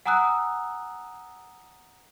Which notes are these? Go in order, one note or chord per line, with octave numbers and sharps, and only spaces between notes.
F#5 G#5 A#5 D#6 E6 F#6